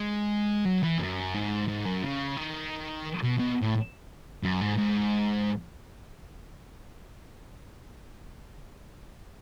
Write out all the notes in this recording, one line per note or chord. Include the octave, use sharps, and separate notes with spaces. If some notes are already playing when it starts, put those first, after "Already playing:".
Already playing: G#3
F#3
E3
F#2
G#2
G#2
F#2
C#3
D#3
B2
B2
A2
F#2
G#2
G#2